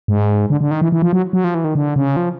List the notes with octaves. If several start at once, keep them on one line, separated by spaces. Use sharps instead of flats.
G#2
D3
D3
D#3
E3
E3
F3
F#3
F#3
F3
E3
D#3
D3
C#3
F3